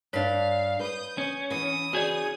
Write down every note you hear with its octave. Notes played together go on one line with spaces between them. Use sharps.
G2 D4 C#5 F5 B6
B4 D#6 G6
C#4
E3 B3 D#6
C#4 F#4 G#4 D5